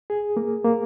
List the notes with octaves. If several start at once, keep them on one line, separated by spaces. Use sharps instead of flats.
G#4
A#3
A#3